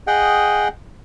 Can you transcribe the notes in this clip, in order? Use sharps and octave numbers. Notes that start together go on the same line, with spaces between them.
G#4 D#5 F#5 G5